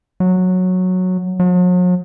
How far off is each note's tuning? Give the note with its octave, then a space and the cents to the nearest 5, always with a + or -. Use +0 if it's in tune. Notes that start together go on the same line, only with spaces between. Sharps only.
F#3 -10
F#3 -45